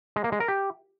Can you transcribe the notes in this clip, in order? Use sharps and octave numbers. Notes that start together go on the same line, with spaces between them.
G#3
A#3
G#3
A#4
G4